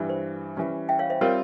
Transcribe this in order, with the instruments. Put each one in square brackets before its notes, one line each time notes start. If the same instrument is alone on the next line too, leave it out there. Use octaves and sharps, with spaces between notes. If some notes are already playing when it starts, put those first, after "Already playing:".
Already playing: [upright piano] G2 E3 G3
[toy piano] C5
[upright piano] E3 G3 C#4
[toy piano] E5 G5
C#5 F5
C5 E5
[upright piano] G3 C4 F4 [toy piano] A#4 C#5